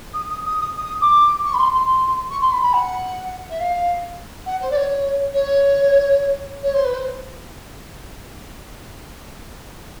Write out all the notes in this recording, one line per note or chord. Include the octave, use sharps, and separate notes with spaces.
D#6
D#6
D#6
D#6
D#6
D6
C#6
B5
C6
C6
C#6
C6
B5
B5
F#5
E5
F5
F#5
C5
D5
C#5
C#5
C#5
C5
B4
C5